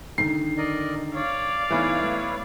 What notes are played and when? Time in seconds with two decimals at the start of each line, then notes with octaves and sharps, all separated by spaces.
0.18 D3 D#3 D#4 C7
0.58 A#4 D5 D#5
1.14 C#5 D5 F5
1.71 E3 A3 B3 D#4 E4 B4 C#5
2.03 A3